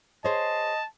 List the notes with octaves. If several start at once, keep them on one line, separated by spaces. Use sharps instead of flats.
G#4 C5 C#5 D#5 A5